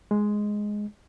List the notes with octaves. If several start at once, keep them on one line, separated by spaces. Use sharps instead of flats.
G#3